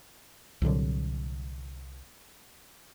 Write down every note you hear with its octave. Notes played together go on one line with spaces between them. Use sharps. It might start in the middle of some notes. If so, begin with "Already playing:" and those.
C2 A#2 D3 F#3